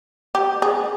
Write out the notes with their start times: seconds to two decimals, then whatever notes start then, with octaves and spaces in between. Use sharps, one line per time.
0.35 G4
0.62 G#4